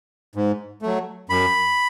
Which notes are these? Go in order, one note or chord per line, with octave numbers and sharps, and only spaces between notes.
G#2
F#3 A3
F#2 B5